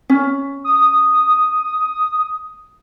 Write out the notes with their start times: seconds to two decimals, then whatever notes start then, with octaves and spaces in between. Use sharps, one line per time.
0.10 C#4
0.64 D#6